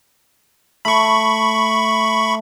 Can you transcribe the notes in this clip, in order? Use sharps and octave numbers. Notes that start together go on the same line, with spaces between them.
A3 B5 C#6